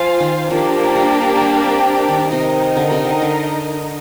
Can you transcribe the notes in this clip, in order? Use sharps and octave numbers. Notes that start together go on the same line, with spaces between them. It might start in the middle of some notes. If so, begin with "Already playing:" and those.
Already playing: F3 F4 C5 F5 G#5
D#3
F3 A#3 D4 G4 A#4
G3
G3
C4
D#3
C3 D#4 A#4 D#5
D3
C3
D3
D3